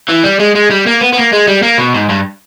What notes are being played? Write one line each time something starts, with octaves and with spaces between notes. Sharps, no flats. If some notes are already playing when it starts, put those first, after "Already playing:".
E3
G3
G#3
G#3
G3
A#3
B3
B3
A#3
G#3
G3
A#3
B2
G#2
G2